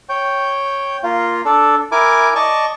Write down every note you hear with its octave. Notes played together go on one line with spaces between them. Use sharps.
C#5 G5
A#3 F4
D4 A4
E4 A#4 G#5 D6
D5 D#5 A5 C#6